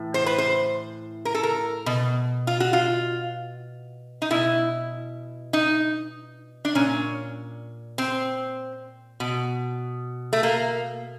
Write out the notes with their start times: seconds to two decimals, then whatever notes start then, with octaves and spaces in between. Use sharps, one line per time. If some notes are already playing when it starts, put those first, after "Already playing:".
Already playing: A2 E3
0.14 C5
0.26 B4
0.38 C5
1.25 A#4
1.34 A4
1.43 A#4
1.86 B2
2.47 F4
2.60 F#4
2.73 F4
4.22 D#4
4.31 B2 E4
5.53 D#4
6.65 D4
6.75 A#2 C#4
7.98 C4
9.20 B2
10.33 A3
10.43 A#3